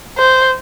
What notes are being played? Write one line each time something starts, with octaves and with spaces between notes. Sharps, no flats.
C5